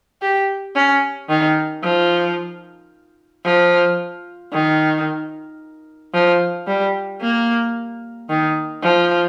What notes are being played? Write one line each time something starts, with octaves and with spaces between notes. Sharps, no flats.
G4
C#4
D#3
F3
F3
D#3
F3
G3
A#3
D#3
F3